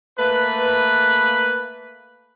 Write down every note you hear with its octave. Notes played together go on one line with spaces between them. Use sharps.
A3 A#3 B4